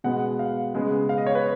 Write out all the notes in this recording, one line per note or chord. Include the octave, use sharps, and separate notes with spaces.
B2 G#3 B3 F#5
F5
C#3 G#3 B3
F5
D#5
C#5
B4